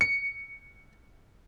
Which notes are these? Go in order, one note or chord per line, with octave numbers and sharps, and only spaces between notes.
C#7